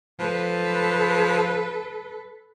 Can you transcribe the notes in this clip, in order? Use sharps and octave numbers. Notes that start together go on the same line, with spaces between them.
F3 A4 B4